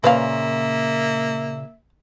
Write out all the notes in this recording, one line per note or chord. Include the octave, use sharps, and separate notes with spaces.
A#2 C#3 A#3 B4 E5 F5